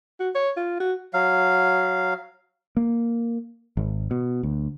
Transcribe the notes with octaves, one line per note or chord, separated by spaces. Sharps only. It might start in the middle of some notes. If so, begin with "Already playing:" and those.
F#4
C#5
F4
F#4
F#3 F5
A#3
G#1
B2
D2